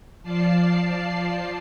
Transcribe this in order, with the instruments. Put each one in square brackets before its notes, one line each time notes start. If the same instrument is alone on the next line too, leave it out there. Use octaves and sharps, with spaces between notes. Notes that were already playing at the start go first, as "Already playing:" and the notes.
[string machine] F3 F4 D5 A5 C7